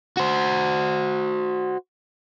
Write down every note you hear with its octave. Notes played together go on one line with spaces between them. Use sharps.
F#4 C5